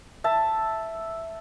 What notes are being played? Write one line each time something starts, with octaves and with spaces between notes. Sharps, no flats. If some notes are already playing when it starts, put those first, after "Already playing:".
E5 A5